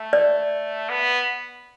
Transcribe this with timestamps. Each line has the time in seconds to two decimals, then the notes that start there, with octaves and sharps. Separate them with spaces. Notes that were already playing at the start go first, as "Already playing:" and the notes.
Already playing: A3
0.13 D5
0.89 B3